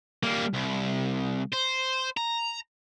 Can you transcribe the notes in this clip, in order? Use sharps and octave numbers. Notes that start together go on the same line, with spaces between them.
G3 A#3
C2
C5
A#5